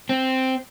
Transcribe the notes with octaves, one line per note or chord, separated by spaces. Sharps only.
C4